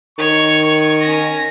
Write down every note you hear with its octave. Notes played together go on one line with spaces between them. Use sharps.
D#3 C#5 C#6
C#4 A#6